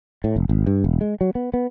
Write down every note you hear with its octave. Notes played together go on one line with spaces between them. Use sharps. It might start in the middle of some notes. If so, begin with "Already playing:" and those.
A2
F1
G#1
G2
E1
G#3
F#3
B3
B3